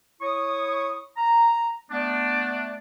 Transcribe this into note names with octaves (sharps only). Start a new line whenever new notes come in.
E4 C#5 C#6 D#6
A#5
A3 B3 D4